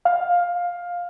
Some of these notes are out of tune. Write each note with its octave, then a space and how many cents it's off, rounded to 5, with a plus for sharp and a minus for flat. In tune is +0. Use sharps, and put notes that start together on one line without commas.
F5 +10